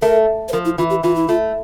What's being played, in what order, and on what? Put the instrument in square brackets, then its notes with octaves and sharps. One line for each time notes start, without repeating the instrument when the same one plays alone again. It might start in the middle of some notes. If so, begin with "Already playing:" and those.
[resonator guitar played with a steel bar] A3 [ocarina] A#4
[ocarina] C5
[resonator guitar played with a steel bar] F3 [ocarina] A#4
[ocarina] E4
[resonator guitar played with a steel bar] E3 [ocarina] F4
[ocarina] G4
[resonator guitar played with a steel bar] E3 [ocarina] F4
[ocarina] E4
[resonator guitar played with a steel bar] A3 [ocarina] F4